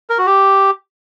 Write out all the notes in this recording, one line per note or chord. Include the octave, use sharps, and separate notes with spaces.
A#4
F#4
G4